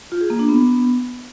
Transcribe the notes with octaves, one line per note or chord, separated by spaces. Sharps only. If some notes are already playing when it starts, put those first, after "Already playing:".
F4
G#4
A#3
D4
B3